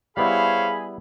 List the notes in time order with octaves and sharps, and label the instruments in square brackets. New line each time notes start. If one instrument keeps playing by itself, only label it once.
[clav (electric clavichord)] G3 B3 E4 [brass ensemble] G#4 [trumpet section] C5 C#5 F5 [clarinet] B5